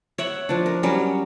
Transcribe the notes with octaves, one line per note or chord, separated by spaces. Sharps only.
C#5 E5 F#5 B5
F3 D4
A#4
F#3 G3 C#4